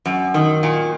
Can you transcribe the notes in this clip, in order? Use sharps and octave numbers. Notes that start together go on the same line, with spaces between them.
F#2
D#3
A#2